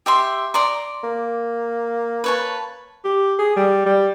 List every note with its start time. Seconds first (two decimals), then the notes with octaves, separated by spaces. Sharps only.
0.06 G4 E5 C6
0.54 D5 A#5 C6
1.03 A#3
2.24 B4 C#5 A5
3.04 G4
3.39 G#4
3.56 G3
3.86 G3